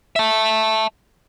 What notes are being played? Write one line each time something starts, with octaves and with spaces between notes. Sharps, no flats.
E5 A5